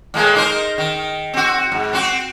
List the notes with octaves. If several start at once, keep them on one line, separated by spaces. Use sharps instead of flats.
A2 G#3 A#3
D#4 A#4 C5
D#3
C4 F#4
G#2
C4 F#4